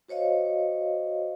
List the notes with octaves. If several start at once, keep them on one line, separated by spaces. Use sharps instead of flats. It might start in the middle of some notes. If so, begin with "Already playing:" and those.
F#4 C5 C#5 D#5 F5